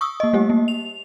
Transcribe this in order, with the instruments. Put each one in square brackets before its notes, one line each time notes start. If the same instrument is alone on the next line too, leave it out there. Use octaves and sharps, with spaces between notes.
[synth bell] C#6 D#6 E6
A#3 D#5
G3 A3 G4
A#3
F7